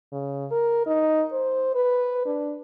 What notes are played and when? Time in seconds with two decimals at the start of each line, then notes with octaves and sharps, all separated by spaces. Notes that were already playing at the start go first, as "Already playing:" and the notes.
0.12 C#3
0.51 A#4
0.87 D#4
1.32 C5
1.75 B4
2.26 D4